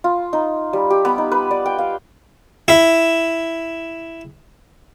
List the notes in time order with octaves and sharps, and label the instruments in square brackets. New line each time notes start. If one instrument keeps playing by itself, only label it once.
[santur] F4
D#4
G3
G4
B3
D#4
B4
D5
G5
F5
[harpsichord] E4 E5